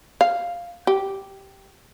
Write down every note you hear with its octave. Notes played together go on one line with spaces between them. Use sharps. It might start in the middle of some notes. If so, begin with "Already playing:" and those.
F5
G4